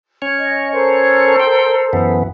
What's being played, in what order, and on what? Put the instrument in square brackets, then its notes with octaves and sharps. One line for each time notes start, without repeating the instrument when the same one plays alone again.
[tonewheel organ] C#4 C#5
[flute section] D#5
A4 A#4 C5
[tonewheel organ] G5
F#2 E3 B3